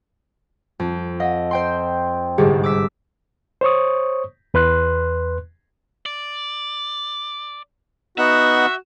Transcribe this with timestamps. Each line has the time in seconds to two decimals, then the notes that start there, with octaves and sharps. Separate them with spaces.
0.80 F2
1.20 D#5 F5 F#5
1.51 C5 G5 C6
2.38 G1 C2 G#2 G4 G#4 D#5
2.63 D6 E6 B6
3.61 C5 C#5 C#6 D#6
4.54 E2 B4 C6 F#6
6.06 D5
8.18 B3 D#4 F#4 E5 F#5